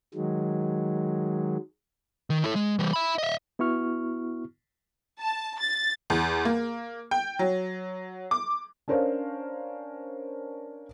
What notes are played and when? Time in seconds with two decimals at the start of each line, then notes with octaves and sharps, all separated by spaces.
0.14 D#3 F#3 G#3
2.30 D#3
2.44 E4 A4
2.56 G#3
2.79 E3 G3
2.93 E5 B5
3.18 D#5 E5
3.59 B3 E4 F#4 C#6 F6
5.20 A5
5.60 A6
6.10 E2
6.45 A#3
7.11 G5
7.39 F#3
8.31 D6
8.88 C#4 D4 A#4 C5 C#5 F5